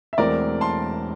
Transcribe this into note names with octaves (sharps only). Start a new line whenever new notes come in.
E5
E1 E2 E3 A3 C4 A#4 D5
A5 C6